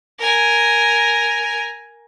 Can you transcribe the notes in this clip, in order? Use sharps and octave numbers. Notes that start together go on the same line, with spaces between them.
A#4 G#5